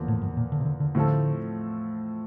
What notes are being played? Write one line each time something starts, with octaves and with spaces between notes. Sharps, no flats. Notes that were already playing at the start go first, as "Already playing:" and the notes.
Already playing: E2 D3 F3 A#3
A2
G2
A#2
D3
C3
D3
D3
A2 D3 F3 C4 F4 A4